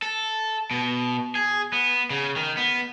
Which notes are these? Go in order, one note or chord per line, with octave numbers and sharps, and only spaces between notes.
A4
B2
G#4
B3
C#3
D#3
B3